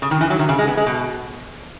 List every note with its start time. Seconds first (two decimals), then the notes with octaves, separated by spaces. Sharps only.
0.02 C#3
0.11 D#3
0.21 E3
0.30 F#3
0.39 D#3
0.49 C#3
0.59 G#3
0.68 B3
0.77 G#3
0.86 B2